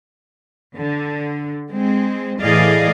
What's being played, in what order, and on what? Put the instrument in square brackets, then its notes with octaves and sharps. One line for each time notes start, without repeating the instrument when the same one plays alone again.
[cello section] D3
G#3 C4
A2 E3 G#4 D5 D#5 F5